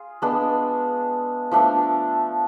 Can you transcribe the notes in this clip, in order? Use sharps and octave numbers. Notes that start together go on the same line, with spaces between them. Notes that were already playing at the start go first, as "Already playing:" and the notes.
Already playing: F4 G#4
G#3 B3 D4
F3 A3 D4